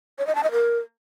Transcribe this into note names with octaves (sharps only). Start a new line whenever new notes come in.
C#5
D#5
A5
D#5
A#4